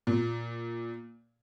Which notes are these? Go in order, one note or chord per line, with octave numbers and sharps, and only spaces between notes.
A#2